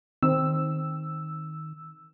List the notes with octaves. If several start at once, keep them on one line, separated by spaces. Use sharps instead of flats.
D#3 C4 E6